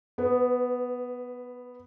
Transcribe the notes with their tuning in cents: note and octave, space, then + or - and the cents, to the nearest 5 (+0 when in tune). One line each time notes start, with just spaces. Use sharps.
B3 +0 B4 +35